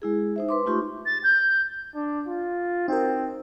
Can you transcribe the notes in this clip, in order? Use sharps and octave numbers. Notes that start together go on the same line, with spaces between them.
G#3 E4 G#4
D#4 C5 E5
B4 C6 D6
A3 D#4 F4 G4 C6 C#6
A6
G6
D4
F4
C4 D#4 F#4 A#4